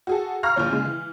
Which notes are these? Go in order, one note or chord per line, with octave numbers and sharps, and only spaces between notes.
F#4 G#4 A4
F5 A#5 B5 C#6 F6 A#6
A#1 D3 F3 C#5
C#3 G#3
E3